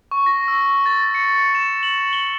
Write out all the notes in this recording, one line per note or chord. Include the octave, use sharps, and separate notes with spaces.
C#6
A#6
E6
A6
C#7
E7
F#7
G7